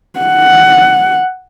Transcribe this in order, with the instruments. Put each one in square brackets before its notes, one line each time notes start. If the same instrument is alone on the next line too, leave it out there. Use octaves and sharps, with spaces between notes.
[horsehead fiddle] F#5